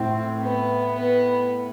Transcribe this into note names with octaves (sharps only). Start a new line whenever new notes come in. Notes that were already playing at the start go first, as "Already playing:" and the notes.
Already playing: A2 C4
B3
B3